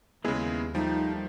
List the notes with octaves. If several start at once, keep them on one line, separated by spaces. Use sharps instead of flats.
D#2 C#3 G#3 B3 E4 G#4
F3 G3 A3 D#4